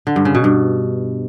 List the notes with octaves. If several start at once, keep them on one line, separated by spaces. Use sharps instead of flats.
D3
G2
C#3
B2
G2